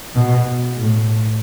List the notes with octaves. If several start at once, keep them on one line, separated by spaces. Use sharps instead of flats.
B2
A2